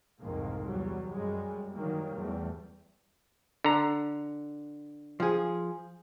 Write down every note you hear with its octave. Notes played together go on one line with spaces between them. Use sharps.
C2 F2 G#2 D#3 A#3
E2 F#3 G3
F#2 G3 G#3
D#3 F#3 G3 A#3
E2 G3 A3
D3 A#5
F3 G#4